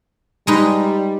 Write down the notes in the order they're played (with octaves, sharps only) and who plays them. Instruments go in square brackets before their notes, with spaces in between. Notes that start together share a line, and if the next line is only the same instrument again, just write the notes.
[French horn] G3 [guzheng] G#3 D#4 B4